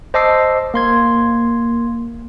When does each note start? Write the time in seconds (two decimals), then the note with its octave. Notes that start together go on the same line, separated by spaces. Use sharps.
0.14 C5 D#5 A5 D6 E6 C7
0.74 A#3 C6 G#6